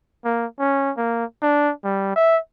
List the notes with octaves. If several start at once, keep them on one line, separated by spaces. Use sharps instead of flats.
A#3
C#4
A#3
D4
G3
E5